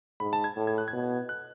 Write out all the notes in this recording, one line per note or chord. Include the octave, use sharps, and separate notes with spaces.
G#2 B5
A5
G#6
A2
G#6
F#6
G#6
B2
F#6